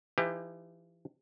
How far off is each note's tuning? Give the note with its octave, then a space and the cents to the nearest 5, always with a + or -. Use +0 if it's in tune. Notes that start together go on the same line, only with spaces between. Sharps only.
E3 +40 D#4 +30 G4 +25